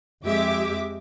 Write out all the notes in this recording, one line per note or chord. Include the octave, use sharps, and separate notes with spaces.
F2 G#3 G4 E5 D6